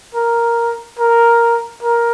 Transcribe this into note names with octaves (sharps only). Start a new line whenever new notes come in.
A#4
A#4
A#4